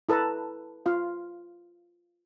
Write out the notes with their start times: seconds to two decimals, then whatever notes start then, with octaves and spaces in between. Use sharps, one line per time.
0.09 E4 A4 B4 A5 A#5
0.86 F4 F5